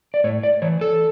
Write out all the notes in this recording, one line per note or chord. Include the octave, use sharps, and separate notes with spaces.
D5
A2 C#5
D5
E3 C#5
A4